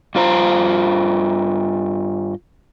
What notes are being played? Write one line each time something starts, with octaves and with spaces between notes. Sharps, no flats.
G2 F4 C5 A#5